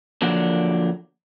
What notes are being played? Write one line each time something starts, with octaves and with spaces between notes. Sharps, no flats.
D3 F3 F#3 A#3 D4